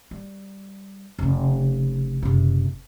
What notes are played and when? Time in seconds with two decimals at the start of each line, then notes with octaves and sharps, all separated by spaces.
0.11 G3
1.19 F1 C#3
2.23 F#1 C3